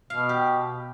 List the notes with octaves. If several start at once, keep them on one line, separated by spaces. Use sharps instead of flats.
B2 F5
G4